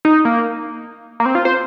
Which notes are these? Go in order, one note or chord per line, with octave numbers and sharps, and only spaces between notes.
D#4
A#3
A#3
C4
F4
C5